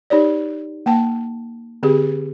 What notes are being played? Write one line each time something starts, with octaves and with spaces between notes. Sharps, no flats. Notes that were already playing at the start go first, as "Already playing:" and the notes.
D#4 G4 C#5 D5
A#3 G5 A5
D3 C4 G4 G#4